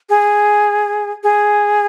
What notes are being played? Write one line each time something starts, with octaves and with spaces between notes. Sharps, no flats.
G#4
G#4